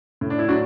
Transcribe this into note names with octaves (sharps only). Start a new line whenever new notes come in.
A2
D4
E4
F#3 D4 F#4